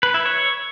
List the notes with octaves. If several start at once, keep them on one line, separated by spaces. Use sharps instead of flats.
B4
E4
C#5